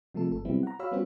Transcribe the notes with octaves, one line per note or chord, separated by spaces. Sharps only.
C3 F3 G#3 A3 A4
G1 A4
C3 F#3 G3 B3 C4 E4
F#5 A#5
F#4 C#5 F5 B5 E6
G3 B3 C#4 F4 F#4 C5